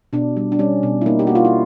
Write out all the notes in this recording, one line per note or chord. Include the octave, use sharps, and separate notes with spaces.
B2 D4
G3
D4
G3 C#4
B2
E4
A#3 D#4
G4
A#3 F#4
F4
E4